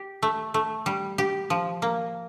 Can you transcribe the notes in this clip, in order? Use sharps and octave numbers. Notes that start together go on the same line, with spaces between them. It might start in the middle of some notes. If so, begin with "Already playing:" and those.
Already playing: G4
A3
A3
G3
G4
F3
A#3